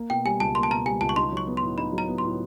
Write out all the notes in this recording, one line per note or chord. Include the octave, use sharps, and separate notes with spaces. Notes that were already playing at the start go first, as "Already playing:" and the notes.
Already playing: A#3
B2 G5
G3 G#5
C#2 A5
A#3 C6
A5
B2 A#5
G3 G#5
C#2 A5
C#6
D#4 C6
F#3 C#6
B3
C6
A2
D#4 B5
F#3
A#5
B3
C6
A2